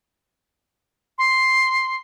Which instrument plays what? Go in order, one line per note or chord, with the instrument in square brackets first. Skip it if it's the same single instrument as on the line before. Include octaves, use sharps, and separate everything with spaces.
[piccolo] C6